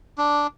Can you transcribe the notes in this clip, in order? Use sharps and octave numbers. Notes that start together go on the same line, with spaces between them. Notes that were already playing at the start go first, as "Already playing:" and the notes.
D4